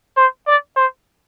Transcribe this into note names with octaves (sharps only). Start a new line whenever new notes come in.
C5
D5
C5